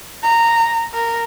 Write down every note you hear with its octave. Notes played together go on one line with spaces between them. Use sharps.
A#5
A#4